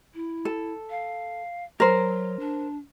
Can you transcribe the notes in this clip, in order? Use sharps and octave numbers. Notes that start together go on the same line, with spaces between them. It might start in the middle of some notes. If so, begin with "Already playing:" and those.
E4
A4
F5
F#3 A#4 C5
D4